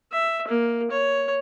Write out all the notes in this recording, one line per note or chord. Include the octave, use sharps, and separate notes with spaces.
E5
A#3
C#5